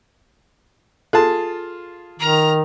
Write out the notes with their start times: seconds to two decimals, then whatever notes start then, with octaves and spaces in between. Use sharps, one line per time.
1.13 F4 G#4 A4 A5
2.19 D#3 A#5 F6